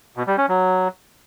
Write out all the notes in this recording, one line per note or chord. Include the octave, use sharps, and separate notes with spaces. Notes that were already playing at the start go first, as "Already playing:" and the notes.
B2
G3
C#4
F#3